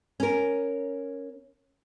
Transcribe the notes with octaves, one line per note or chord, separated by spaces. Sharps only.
C#4 A#4